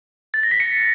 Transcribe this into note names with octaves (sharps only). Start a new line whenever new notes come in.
A6
A#6
B6
C#7